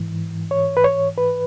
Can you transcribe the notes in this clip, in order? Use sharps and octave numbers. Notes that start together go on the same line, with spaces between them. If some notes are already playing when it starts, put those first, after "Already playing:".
Already playing: G#2 E3
C#5
B4
C#5
B4